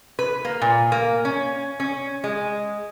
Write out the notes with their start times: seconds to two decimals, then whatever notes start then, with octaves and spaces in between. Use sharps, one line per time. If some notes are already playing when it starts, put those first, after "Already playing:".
0.19 B4
0.45 A#3
0.62 A#2
0.92 A#3
1.25 C#4
1.80 C#4
2.24 G#3